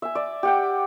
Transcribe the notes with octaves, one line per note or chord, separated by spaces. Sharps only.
E5 G#5
D5
G4 F#5 G5